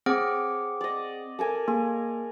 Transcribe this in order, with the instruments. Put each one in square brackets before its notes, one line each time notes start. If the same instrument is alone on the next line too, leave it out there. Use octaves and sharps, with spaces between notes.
[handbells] C4 G#4 F#5 [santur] C#5 D6
[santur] D5 D#5
A4 A#4 G#5
[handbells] A#3 [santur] G#4